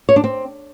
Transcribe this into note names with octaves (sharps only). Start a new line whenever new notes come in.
C#5
D4
C4